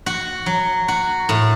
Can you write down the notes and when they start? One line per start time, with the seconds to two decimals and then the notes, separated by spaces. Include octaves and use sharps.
0.06 F#4
0.46 F#3
0.88 F#4
1.29 A2